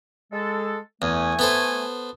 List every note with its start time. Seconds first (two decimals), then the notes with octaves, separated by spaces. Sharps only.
0.32 G#3 A4
1.02 E2 A3 G#5
1.39 B3 A4 C5